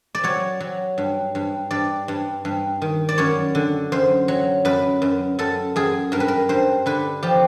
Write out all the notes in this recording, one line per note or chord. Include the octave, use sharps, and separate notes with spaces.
D5
F#3 C#5
F#3
G2
G2
G2 D5
G2
G2
D#3
D5
F#2 C#5
D3
F#2 C5
F#3
F#2 B4
F#2
F#2 A4
F#2 G#4
G2 A#4
B4
A#4
G2 C5
D3 B4
F3 G4